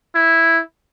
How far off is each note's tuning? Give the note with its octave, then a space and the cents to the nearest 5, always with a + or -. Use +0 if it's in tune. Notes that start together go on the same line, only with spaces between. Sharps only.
E4 +0